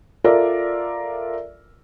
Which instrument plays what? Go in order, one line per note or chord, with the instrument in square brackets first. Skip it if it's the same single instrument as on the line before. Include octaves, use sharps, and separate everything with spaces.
[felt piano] F4 A4 A#4 D5 E5